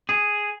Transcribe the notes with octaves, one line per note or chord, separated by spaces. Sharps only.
G#4